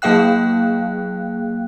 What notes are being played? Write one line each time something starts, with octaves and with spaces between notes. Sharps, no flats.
F#3 A#3 G#4 F5 G5 F#6